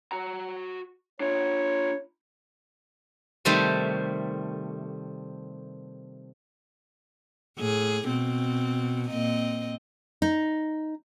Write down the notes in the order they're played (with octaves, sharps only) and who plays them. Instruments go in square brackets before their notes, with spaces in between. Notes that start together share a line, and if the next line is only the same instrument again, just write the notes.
[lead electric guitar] F#4 A#5
[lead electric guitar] D4 F4 [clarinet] C#5
[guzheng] C3 D#3 G3 A3 C4
[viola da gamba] A2 G#4
B2 C4
A#2 C4 D#5
[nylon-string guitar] D#4